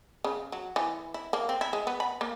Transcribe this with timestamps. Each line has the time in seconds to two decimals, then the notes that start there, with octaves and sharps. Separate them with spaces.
0.24 C#3
0.52 F#3
0.76 E3
1.14 E4
1.33 A#3
1.49 C4
1.61 E4
1.73 G#3
1.87 B3
2.00 B5
2.21 A#3